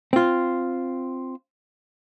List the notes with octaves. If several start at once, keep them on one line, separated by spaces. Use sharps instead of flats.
C4 F4